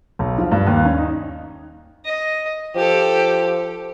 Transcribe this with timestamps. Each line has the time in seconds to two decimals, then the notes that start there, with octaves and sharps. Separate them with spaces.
0.19 B1
0.38 F3
0.52 G2
0.67 D#2
0.85 C#4
0.98 D#4
2.05 D#5
2.75 F3 G4 A4